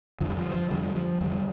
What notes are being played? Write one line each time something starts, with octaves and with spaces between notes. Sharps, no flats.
F2 D3 F3
G3
F3
F3
F2 D3 G3
F3
F2 D3 G3